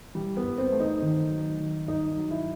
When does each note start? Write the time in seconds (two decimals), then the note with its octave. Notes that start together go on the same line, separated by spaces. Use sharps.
0.15 E3 G3
0.37 B3
0.44 G2
0.58 C4
0.72 A3
0.80 D#4
1.02 D#3
1.31 F#3
1.60 D#3
1.88 G2 D#4
2.17 F#3
2.31 E4